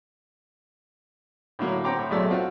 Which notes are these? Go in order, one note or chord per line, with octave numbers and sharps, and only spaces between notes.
A2 D3 F#3 A#3
C4 F#5 G5 A#5 C6 D6
A2
B1 F#3 G#3 A3 D5 E6
C4 F4 F#4